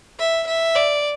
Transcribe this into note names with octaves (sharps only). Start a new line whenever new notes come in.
E5
E5
D5